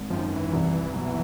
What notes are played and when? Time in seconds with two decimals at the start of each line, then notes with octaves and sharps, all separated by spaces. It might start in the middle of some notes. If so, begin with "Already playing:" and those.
Already playing: G#1
0.10 F#2 D#3 F3
0.32 E3
0.53 C2
0.94 B2 F#3